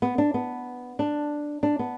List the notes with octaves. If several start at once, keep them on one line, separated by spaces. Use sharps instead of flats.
B3
D4
B3
D4
D4
B3